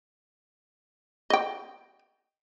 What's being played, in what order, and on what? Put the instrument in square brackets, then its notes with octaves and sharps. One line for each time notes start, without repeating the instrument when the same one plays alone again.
[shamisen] D#5 G5